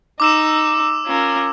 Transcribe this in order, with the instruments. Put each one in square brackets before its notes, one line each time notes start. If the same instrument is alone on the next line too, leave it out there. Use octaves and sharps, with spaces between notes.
[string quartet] D#4 [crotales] D6 E6 E7
[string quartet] C#4 F4 A#4